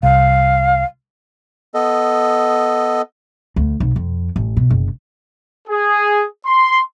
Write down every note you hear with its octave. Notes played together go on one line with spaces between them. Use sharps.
C2 F5
B3 A4 D#5
D2
B1
F2
A1
B2
F#1
G#4
C6